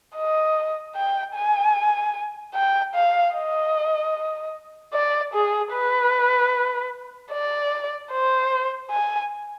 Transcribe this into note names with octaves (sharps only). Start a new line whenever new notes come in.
D#5
G5
G#5
G5
F5
D#5
D5
G#4
B4
D5
C5
G#5